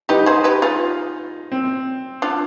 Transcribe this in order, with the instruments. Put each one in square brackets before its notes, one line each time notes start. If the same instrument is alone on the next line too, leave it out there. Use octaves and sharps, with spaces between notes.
[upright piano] D#4 [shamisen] G4 B4
[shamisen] G#4 C5
G4 B4
F4 G#4
[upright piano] C4
[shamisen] D4 F4